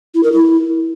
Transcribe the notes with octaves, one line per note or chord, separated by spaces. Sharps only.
E4
A#4
E4